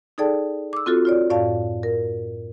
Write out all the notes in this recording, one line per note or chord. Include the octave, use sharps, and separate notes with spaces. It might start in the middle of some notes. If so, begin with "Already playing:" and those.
D#4 G#4 A4 D5 G5 A5
D6 E6
C4 F4 F#4 A4
F4 C#5 D5
F#2 A2 D5 F5 A5
A#4